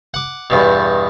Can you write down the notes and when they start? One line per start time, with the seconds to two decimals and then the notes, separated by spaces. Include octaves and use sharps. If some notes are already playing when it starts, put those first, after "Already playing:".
0.14 F#5 D6
0.50 E2 G2 B2